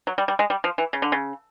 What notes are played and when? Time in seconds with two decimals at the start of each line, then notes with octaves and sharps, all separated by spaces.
0.07 F#3
0.18 G3
0.28 G3
0.39 G#3
0.50 G3
0.64 F3
0.78 E3
0.93 C#3
1.02 D3
1.12 C#3